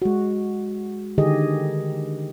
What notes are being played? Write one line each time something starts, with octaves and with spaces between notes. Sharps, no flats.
G#3 F#4
D3 D#3 G4 G#4 D#5